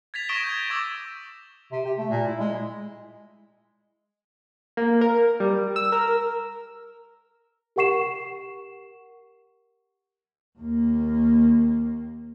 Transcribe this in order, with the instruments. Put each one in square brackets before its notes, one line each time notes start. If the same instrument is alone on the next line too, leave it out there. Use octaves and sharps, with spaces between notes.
[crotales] G#6 A6 B6 F7
C#6 D#6 A#6 D7 E7 G7
G6 G#6
C#6 D6 E6 A6
[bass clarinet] C3
G4
A3
A#2
E4
G#3
[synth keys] A#3
A#4
G3
E6
A#4
[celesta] G4 A#4 F#5 C#6 C7 E7
[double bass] D#2 A#3